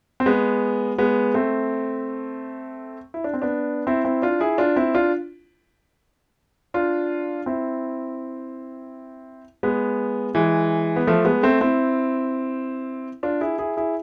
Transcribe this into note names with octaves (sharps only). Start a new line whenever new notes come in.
C4
G#3 B3
G#3 B3
A3 C4
E4
D4
C4
B3 D4
C4 E4
C4 E4
D4 F4
E4 G#4
D4 F4
C4 E4
D4 F4
D4 F4
C4 E4
G#3 B3
E3 G#3
B3
F3 A3
G#3 B3
A3 C4
C4 E4
D4 F4
E4 G#4
E4 G#4
E4 G#4